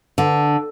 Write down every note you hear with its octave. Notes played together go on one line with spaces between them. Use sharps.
D3